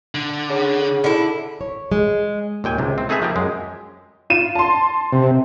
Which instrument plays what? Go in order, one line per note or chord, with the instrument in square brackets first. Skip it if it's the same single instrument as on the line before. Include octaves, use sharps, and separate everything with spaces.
[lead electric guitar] D3
[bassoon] C#3
[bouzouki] D3 E4 [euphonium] A4
[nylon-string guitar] C#5
G#3
[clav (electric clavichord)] D#2 A#2 G5 G#5
C#2 C3
C4
A3 D#4 G#4 B4 E5 G#5
F3 A#3 G4
F#2 G#3
[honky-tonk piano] F4 D#7 E7
A5 C6
[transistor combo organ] C3